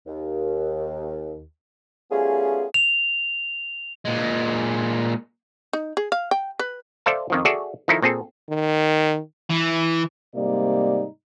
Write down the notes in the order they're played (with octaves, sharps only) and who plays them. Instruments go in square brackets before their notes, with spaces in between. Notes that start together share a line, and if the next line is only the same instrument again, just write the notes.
[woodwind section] D#2
G3 A3 B3 C#4 F4 G#4
[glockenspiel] F7
[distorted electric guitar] A#2 G#3
[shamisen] D#4
G#4
F5
G5
B4
[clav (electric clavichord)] A4 C5 D5 E5 F5 A5
F2 D#3 F3
F#4 G#4 A4 D5 E5
D#3 F3 D#4 E4 A4
A#2 C4 G#4 A4
[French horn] D#3
[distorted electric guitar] E3
[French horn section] G#2 C3 G3 A#3 D#4 D5